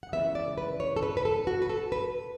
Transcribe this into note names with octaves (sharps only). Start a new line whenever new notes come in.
F#5
C#3 E3 G#3 B3 E5
D5
B4
C#5
A4
B4
B4
A4
F#4
B4
A4
B4